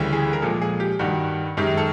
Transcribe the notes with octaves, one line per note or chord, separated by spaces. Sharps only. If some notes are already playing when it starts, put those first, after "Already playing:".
Already playing: D2 C#3 E3 G3
G#4
A#4
A#2 F3 G#3 A4
G#4
G4
G2 D#3 G3 F#4
F#2 D#3 G#3 G4
A4